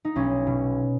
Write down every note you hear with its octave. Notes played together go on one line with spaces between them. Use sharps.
D#4
B1 C#4
B2